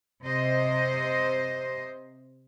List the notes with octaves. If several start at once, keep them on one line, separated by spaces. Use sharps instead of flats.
C3 C5 D#5